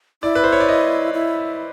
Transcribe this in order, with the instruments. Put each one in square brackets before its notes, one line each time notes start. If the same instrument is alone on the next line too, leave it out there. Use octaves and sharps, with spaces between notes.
[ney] E4 [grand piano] D5
[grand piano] B4
C5
C#5
D5
D#5
[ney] E4